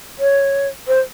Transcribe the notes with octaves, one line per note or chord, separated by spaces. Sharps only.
C#5
C5